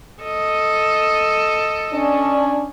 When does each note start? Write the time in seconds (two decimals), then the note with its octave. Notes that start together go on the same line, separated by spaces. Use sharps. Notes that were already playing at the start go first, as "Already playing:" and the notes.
0.23 A4 D#5
1.93 C#4 D4